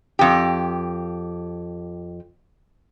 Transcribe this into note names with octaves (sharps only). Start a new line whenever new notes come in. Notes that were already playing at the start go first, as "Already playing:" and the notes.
F2 G4